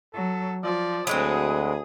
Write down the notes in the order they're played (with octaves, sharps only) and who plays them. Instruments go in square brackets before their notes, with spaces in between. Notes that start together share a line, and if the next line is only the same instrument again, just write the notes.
[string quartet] F#3 [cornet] A4
[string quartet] F3 [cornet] D5
[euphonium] D2 [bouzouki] F#3 G#3 C4 [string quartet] G#4 D#6 [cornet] B5